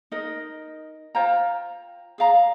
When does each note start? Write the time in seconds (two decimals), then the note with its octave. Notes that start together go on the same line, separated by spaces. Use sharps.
0.12 D#4 A#4 D#5
1.15 F4 C5 G5 A#5
2.18 G#4 D5 F5 A#5